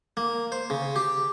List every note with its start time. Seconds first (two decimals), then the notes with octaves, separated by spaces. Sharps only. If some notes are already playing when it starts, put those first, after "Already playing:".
0.17 A#3
0.52 C5
0.70 C#3
0.96 G4